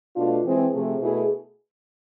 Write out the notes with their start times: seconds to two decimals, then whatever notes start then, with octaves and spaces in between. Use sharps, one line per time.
0.16 B2 A3 D4 F4
0.44 E3 G#3 C4 G#4
0.73 C3 F3 A3 C4 G#4
1.00 B2 A3 E4 G#4